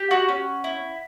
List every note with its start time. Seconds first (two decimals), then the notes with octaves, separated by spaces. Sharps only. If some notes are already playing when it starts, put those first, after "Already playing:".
Already playing: G4
0.11 F#4 F#5
0.29 C#4
0.64 E4